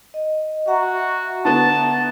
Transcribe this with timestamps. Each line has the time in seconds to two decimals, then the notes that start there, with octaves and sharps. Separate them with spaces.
0.14 D#5
0.67 F#4 E5 F#5 A#5
1.45 D3 B3 A5